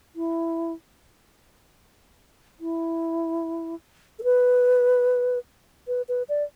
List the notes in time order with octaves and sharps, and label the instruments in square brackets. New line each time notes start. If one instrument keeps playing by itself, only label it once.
[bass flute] E4
E4
A4
B4
B4
B4
D5